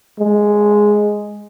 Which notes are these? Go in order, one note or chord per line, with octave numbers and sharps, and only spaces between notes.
G#3